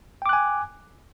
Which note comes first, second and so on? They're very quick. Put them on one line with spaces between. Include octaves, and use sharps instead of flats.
G5 D6 F#6 G#5